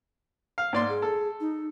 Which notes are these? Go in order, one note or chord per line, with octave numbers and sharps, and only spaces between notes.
F5
G#2 A#3 D5 C6
G#4
A4
D#4